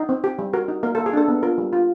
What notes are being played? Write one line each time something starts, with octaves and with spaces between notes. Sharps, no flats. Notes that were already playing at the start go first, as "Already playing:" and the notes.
Already playing: D#4
C4
G4
G3
F#4 A#4
D#4
A#3 A#4
A#3 A4
G#4
D4 A4
B3
F4 A#4
G3
F4